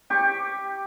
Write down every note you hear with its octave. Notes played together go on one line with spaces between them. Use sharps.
G4 C#6